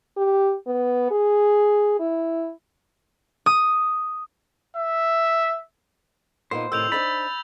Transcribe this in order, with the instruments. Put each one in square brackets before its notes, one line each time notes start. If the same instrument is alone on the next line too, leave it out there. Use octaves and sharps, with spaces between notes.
[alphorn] G4
B3
G#4
E4
[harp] D#6
[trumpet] E5
[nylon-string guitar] A#2 B3 D#4 [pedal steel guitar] C5
[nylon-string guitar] A2 C3 D#3 [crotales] E6 G6 F7
[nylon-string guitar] D4 D#4 C5 [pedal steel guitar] B5 [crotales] A6